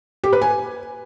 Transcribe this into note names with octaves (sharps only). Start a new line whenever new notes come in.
G4
B4
G#5